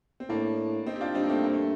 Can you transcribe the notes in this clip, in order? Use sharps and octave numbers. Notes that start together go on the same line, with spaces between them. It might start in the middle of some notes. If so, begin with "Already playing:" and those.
C4
A2 A#3 D4
C4 D#4
G4
D4 F4
G2 C4 D#4
A#3
A3 C4
A#3
A3